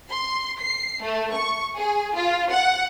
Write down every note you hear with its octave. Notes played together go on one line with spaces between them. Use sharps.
C6
C7
A3
C#6
G#4
F4
F#5